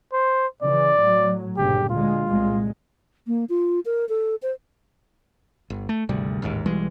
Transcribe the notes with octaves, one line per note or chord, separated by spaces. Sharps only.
C5
C#3 E3 D5
A2 F#3
G1 A#2 C#3 G4
D2 G#3 F4
C2 A#2 G#3
A#3
F4
A#4
A4
C5
G1
A3
G#1 D2 C3 G3
A1 D#2 G#2
B1 E3 G3 G#3